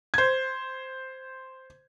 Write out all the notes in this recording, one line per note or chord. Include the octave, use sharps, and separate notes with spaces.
C5 G#6